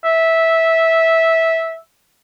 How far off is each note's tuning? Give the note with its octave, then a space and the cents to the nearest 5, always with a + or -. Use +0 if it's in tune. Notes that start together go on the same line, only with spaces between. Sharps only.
E5 -10